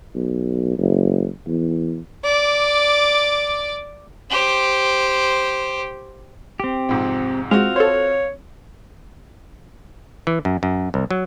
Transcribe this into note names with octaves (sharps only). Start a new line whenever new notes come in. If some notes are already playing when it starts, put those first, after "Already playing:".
B1
F#1
E2
D5 D6
G4 C5
C4 G4
F2 G#2 C3
G#3 C4 F4 F#4 F5
A4 C5 C#5
E3
F#2
F#2
C2
F#3